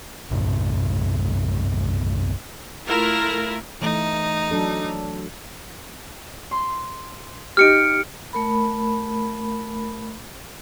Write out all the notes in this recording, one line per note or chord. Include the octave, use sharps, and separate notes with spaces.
B1 F#2 A2 C3
A3 E4 F4 A#4
E3 A3 D#4
F#3 D4 A4
C6
D#4 G4 F6 C#7 D7
A3 A#4 B5